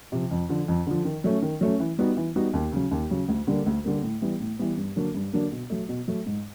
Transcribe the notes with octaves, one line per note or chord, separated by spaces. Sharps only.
C3 F3
F2
D3 F3
F2
D3 F3
D#3
F#3 A3 C#4
D#3
F#3 A3 C#4
E3
G3 B3 D#4 F#4
E3
G3 B3 D#4 F#4
D#2
C#3 F#3
D#2
C#3 F#3
D2
D3 G3 A#3
D2
D3 G3 A#3
A2
E3 G3 B3
A2
E3 G3 B3
G2
D3 F#3 A#3 D4
G2
D3 F#3 A#3 D4
B2
F#3 A3
B2
F#3 A3
G#2